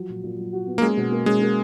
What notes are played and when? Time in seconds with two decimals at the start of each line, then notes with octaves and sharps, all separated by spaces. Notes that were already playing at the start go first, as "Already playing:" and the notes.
Already playing: F3 F#3
0.09 A#2
0.24 A#2
0.38 F#3
0.53 F#4
0.67 B3
0.78 A#3
0.82 G#3 C#4
0.97 B2
1.12 A#3
1.26 G#3 C#4
1.42 A#3